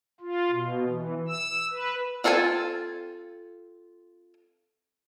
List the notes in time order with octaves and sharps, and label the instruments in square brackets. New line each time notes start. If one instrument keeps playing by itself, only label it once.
[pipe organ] F4
B2
E3
E6
B4
[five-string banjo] C4 F4 A4 C#5 G#5